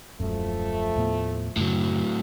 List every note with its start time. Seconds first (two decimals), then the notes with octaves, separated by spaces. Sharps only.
0.20 D#1 F#2 F3 A3
0.96 D#2 A2 B3
1.57 F#2 A2 C#3 F#3